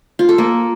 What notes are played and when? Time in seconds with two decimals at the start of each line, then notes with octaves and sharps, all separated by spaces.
0.19 F4
0.29 A4
0.38 A#3